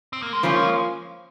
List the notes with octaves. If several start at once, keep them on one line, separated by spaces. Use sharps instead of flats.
C4
A#3
G#3
F3 G3 A#3 C#4 F4
G#3